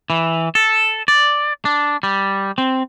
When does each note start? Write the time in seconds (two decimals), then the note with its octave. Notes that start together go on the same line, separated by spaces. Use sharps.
0.10 E3
0.55 A4
1.08 D5
1.65 D4
2.03 G3
2.58 C4